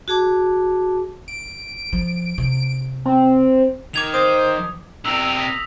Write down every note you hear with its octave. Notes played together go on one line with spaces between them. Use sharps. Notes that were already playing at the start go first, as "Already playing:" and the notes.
F#4 G#4 A5 D6
D7
F3
C3
C4
D#3 D6 G#6 F7
C5 D#6
C3 A#4 E6 F7 F#7
D#6 A#6 B6